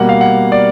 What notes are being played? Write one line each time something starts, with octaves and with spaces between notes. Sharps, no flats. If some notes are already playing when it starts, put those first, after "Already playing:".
Already playing: B2 G3 A#3 F#5
F5
F#5
D5